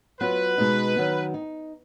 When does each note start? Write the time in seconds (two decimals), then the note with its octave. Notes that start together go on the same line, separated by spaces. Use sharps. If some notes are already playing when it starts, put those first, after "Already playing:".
0.20 F#3 B3 F4 B4
0.58 B2 G#3 D#4
0.96 D#3 F#3 B3
1.34 D#4